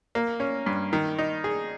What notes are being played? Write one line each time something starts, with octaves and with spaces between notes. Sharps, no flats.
A#3
C#4
G2
D#3
D#4
G#4